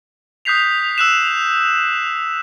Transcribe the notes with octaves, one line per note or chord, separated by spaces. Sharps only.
D#6 F#6 G6 B6 C7 F7
E6 F#6 E7